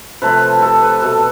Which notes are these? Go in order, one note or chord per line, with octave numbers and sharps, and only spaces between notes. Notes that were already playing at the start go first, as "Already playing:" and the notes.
C3 F3 A3 B4
G4 A4
B4
B2 A3 A4